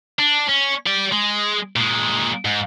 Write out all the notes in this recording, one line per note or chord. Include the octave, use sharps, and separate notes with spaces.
D4
C#4
G4 D5
G#3
A#2 G#3
G#2